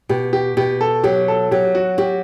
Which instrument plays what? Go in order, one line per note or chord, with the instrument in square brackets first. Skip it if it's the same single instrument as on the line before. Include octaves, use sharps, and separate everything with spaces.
[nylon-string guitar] B2 [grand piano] G4
[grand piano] G4
[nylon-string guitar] B2 [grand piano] G4
[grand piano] A4
[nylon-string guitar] F#3 [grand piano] G4
[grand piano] A4
[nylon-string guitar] F#3 [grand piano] G4
[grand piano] F#4
[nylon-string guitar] F#4 [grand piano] G4